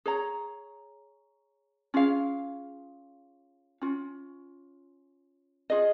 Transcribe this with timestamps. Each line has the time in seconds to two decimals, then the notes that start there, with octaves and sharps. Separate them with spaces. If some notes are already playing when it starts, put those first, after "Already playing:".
0.06 G#4 C#5 A#5
1.94 C#4 F4 G#4 F5
3.81 C#4 F4
5.70 F4 G#4 D#5